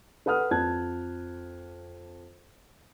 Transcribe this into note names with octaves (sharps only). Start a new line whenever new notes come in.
A4 B4 F#5 D#6 F6
F2 A5 F#6 G#6